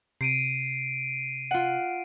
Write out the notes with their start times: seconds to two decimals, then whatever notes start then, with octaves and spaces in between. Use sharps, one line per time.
0.21 C3 C7 D7 D#7
1.51 F4 F#5